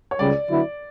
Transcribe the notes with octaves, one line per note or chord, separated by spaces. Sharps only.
C#5
C#2 C#3 G3 D5
D3 F#3 B3 E4